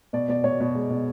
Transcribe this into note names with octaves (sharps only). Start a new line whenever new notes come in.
B2 D5
B2 D5
B2 C#5
B2
G#3
B2